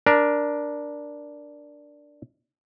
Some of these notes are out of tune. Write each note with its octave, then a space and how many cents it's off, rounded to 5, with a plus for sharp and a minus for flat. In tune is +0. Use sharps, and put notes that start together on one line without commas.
D4 +0 A#4 +15